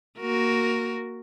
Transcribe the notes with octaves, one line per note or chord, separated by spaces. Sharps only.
A#3 F#4 A#4